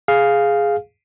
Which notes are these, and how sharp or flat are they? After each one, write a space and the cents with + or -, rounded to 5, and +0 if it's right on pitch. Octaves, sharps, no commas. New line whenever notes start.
G#4 +0 F5 +0